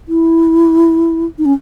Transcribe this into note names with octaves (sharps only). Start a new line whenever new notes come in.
E4
D#4
C#4